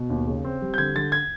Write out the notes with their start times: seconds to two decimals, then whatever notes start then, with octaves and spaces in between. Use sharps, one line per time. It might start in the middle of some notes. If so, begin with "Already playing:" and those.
Already playing: B2
0.10 D#2
0.27 C#3
0.44 C4
0.62 G3
0.74 G6
0.78 D3 G#6
0.96 D3 A6
1.12 G#6